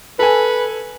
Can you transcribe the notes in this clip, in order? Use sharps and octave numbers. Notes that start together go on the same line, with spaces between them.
A4 B4 G#5